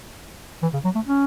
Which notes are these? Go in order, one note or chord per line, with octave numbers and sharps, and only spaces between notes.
E3
C#3
F#3
A3
C#4